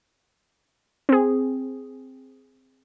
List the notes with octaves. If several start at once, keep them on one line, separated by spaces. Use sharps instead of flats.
C4 G#4